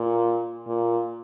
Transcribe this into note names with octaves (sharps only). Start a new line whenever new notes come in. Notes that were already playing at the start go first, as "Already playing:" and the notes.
Already playing: A#2
A#2